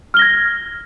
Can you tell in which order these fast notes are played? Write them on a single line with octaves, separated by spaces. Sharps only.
F6 G7 A#6 G#6